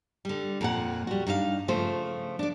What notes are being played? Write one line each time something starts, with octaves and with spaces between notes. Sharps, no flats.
D3 G3
F2 A#2 F#5
G3 F#4
G2 D#4 F#4 F5
C#3 F3 A3 F4 C5
D4 D5